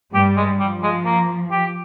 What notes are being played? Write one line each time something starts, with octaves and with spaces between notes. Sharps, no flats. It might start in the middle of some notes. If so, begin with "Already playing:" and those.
G2 G3 G4
G#3
F3 G3
G#3
A#3
G4